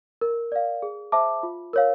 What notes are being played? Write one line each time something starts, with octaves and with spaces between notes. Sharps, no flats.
A#4
D5 F5
G#4
C5 E5 A5 D6
F4
A#4 C#5 F5